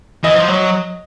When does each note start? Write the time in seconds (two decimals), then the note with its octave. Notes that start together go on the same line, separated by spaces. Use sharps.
0.23 E3 D#5
0.35 F3
0.48 F#3